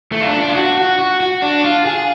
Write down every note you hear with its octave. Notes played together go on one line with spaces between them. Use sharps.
A3
F4
D4
D4
F4
F#4
F#4
F#4
F#4
D4
F4
G#4